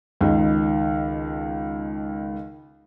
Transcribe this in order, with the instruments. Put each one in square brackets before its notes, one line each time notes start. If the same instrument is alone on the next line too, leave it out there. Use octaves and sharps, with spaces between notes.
[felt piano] C#2 D#3